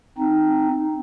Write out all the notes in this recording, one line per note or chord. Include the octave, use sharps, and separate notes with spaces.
C4 D#4